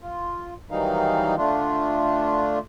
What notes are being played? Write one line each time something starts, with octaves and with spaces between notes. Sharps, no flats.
F4
D#3 E3 F#3 G3 D#4 F5
D3 A3 D4 F4